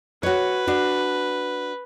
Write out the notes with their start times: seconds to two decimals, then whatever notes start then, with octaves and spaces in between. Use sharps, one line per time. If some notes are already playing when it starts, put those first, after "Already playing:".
0.23 F#4 B4 C#5
0.67 D4 F#4